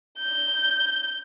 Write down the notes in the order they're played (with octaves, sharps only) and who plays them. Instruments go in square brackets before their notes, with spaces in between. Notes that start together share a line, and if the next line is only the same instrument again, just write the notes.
[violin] G6